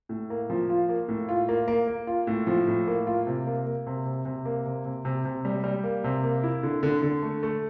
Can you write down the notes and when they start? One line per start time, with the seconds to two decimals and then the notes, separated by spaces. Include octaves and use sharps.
0.09 A2
0.30 A#3
0.50 F3
0.70 F4
0.89 A#3
1.08 A2
1.29 F4
1.49 A#3
1.68 A#3
1.88 A#3
2.07 F4
2.27 A2
2.47 F3
2.68 A2
2.87 A#3
3.07 F4
3.27 C3
3.47 A#3
3.66 A#3
3.87 C3
4.06 C3
4.25 C3
4.45 A#3
4.65 C3
4.85 C3
5.05 C3
5.25 C3
5.45 G3
5.64 G3
5.84 A#3
6.04 C3
6.24 A#3
6.43 E4
6.63 D3
6.83 D3
7.02 D3
7.22 A3
7.43 A3